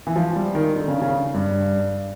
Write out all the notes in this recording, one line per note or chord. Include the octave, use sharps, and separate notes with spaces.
E3
F3
G3
D#3
D3
C#3
C#3
G2